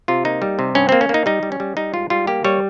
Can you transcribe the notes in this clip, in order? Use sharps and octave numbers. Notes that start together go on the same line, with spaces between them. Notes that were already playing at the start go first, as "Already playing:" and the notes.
C3 F4
A#3 D#4
G3
C3
G2 C#4
A#3 C4
C#4
A#3
D#4
G3 D#4
G3
C#4
G3
G3 D#4
G#2 F4
G3 F4
A#3 G4
G3 C#5